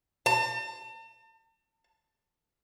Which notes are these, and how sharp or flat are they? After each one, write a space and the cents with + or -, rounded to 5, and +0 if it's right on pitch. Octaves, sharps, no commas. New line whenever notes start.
A5 +40